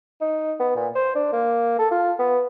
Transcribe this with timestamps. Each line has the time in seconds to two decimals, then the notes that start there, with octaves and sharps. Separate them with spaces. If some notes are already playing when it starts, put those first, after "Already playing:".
0.21 D#4
0.60 B3
0.76 A#2
0.95 C5
1.15 D4
1.33 A#3
1.79 A4
1.91 F4
2.19 B3